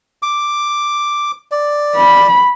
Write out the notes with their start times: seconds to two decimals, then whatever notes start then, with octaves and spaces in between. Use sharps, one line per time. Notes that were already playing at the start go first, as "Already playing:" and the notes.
0.23 D6
1.51 D5
1.96 B5